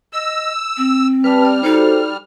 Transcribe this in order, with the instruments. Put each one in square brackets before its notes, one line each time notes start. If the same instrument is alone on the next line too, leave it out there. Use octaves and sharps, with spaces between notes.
[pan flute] D#5 [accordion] E6
[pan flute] C4
[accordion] G3 F6 [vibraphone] B4 G5 A5
[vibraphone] D5
[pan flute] D#4 [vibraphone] F#4 A4 C5